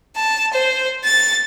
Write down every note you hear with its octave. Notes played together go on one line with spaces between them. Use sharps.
A5
C5
A6